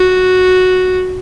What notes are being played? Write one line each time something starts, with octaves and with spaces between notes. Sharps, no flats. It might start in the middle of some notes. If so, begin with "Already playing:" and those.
Already playing: F#4